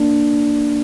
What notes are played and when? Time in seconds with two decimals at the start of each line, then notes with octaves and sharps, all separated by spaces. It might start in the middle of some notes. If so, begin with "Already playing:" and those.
Already playing: A#3 D4